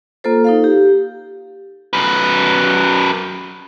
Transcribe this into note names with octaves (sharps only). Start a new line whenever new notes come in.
A#3 F4 A4 C5
D#4 A4 F5
G4
F#2 B4